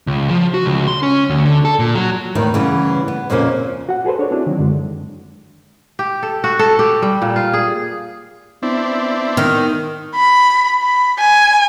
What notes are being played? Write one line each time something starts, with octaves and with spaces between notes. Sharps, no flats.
C#2
F3
F#4
C#2
C6
C#4
D2
D3
A4
A#2
F#3
E2 A2 D#3
C#3 E3 G3 B3
B3
F2 A#2 C#3 F3 A#3 C#4
F#4 F#5
F#4 G#4 A4 B4 C5
D4 C#5
C4 D4 E4 F#4
D#3 F#3
F#2 D3 G#3
G4
A4
F#4
A4
G4
G3
A#2
F4
G#4
B3 C4 D4 E4
D#3
B5
B5
G#5